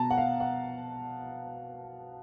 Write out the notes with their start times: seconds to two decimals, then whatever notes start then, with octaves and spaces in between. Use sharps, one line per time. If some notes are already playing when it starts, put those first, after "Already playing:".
Already playing: B2 A5 A#5
0.10 F#5
0.17 F5
0.40 F#5